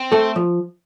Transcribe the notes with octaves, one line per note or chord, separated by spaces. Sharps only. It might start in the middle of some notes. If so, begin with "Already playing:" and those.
Already playing: C4
A3 A4
F3